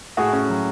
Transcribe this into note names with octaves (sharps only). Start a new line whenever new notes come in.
A2 F#4 G#4
C#4
F#3